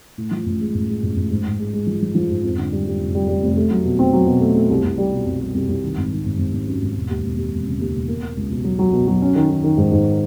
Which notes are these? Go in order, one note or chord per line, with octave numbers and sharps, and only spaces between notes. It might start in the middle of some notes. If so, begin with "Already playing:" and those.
A2
F3
A1
G#3
A1
G#3
A1
A1
G#2
G#2
G#3
G#3
F3
F3
F3
G#2
F2
D3
G3
G3
F1
G3
G3
F1
A3
F#3
B2
C4
F#3
B2
A3
A3
C2
C2
G3
B2
C2
G3
C2
C2
D#3
G#1
D#3
G#1
G#1
G#1
F#2
G#1
E1
D#2
E1
D#2
E1
C#3
D#2
E1
A#3
A#3
C#2
B2
F#3
F#3
B2
F#3
C#4
D#3
D#3
D#3
G#2
G#2